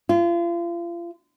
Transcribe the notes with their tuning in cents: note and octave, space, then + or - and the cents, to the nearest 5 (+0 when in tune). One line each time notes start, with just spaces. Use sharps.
F4 -35